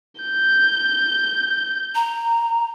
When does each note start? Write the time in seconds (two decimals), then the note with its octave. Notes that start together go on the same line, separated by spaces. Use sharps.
0.21 G6
1.95 A#5